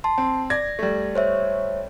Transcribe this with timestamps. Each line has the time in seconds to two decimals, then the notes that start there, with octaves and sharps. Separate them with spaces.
0.04 A5 C6
0.18 C4
0.50 D5 G#6 A#6
0.79 G3 A3
1.15 C5 C#5 E5